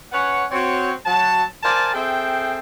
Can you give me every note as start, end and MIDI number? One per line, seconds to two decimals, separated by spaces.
0.12 0.44 61
0.12 0.44 71
0.12 0.44 73
0.12 0.44 78
0.52 0.91 60
0.52 0.91 66
0.52 0.91 73
1.06 1.43 54
1.06 1.43 81
1.63 1.91 70
1.63 1.91 72
1.63 1.91 74
1.63 1.91 77
1.63 1.91 80
1.63 1.91 81
1.94 2.59 60
1.94 2.59 68
1.94 2.59 69
1.94 2.59 76
1.94 2.59 79